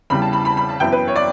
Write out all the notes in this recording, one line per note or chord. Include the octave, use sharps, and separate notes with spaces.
E2 C#3 E3 G3 B5
A5
B5
B5
B5
A5
F#2 E3 B3 E4 G5
B4
C#5
D5